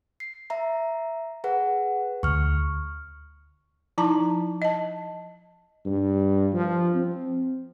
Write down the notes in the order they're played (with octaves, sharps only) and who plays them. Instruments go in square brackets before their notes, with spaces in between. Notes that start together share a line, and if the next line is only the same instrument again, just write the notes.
[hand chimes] C7
E5 A#5
G#4 B4 F#5
[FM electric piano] D2 [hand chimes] C#6 F6
[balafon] F3 D#4 E4 A5 A#5 D6
D#5 A5
[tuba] G2
F3
C4